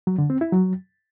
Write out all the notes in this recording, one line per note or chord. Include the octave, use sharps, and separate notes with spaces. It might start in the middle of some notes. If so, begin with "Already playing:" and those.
F#3
D3
C4
E4
F#3